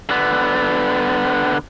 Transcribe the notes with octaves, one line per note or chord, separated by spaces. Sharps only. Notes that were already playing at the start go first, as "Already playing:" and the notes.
D3 B3